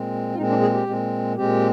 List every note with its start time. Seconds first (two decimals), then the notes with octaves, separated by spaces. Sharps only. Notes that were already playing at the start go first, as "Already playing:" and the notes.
Already playing: A#2 G#3 C4
0.33 F4
0.37 A#2 G#3 C4 D#4
0.50 D4
0.61 G#4
0.74 G4
0.87 A#2 G#3 C4
1.37 A#2 G#3 C4 G4